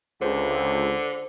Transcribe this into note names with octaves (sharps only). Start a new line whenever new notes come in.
C#2 D3 C5